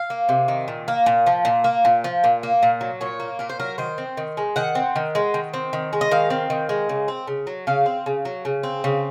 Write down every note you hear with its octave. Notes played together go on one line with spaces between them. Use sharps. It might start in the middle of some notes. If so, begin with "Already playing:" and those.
Already playing: F5
A#3
C3
D#3
A#2
A#3
A#2
F3
A#2
A#3
A#2
F3
A#2
A#3
A#2
F#3
A#2 C#5
A#3
A#2 A#4
C5
F#3 A#4
D#3 C5
C4
D#3
G#3
D#3 F#5
C4
D#3
G#3
D#3
C4
D#3
G#3
D#5
D#3 F5
C4
D#3
G#3
C#3
C4
C#3
F#3
C#3 F5
C4
C#3
F#3
C#3
C4
C#3